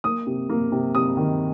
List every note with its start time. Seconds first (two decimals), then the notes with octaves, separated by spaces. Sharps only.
0.04 A#3 D#6
0.27 C3
0.50 A#3
0.72 C3
0.95 C3 D#6
1.17 D#3